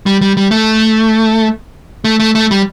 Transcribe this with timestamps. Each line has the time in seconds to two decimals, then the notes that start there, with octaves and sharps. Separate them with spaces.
0.06 G3
0.21 G3
0.37 G3
0.51 A3
2.04 A3
2.20 A3
2.35 A3
2.51 G3